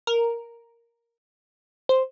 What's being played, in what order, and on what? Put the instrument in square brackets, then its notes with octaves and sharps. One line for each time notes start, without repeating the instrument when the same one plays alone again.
[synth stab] A#4
C5